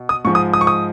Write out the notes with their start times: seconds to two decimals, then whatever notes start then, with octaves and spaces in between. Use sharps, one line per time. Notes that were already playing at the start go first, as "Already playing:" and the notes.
Already playing: B2
0.09 D#6
0.25 G#2 F3 G#3 C#6
0.35 D#6
0.53 D#6
0.61 C#6
0.67 D#6